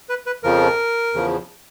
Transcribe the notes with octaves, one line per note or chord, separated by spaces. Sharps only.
B4
B4
F2 C#3 F3 A#4
E2 C#3 F3